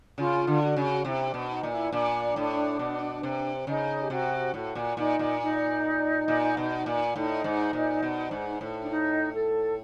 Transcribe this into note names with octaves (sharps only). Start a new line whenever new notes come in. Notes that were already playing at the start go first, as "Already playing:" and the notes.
C#3 F4
D3
F#4
C#3
C3 E4
D4
B2
D#4
A#2
E4
A#2 D4
A2
B2
C3
C#3 D#4
G4
C3 F#4
A2 F#4
A#2
A#2 D#4
A#2
D#4
A#2
B2
A#2
A2 D#4
G#2
A#2
B2
G#2
A2
D4
D#4
A4